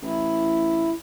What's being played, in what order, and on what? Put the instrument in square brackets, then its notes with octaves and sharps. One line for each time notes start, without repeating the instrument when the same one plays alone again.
[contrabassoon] A1 [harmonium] E4